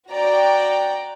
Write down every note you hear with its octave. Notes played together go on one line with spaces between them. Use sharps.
F#4 D5 G5 A#5